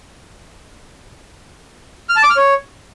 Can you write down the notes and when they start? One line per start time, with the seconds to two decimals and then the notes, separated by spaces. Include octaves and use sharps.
2.09 F6
2.16 A5
2.23 D6
2.30 F6
2.37 C#5